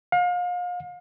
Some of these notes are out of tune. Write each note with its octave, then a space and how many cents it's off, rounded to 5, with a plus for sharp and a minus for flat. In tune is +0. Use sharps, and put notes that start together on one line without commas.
F5 +35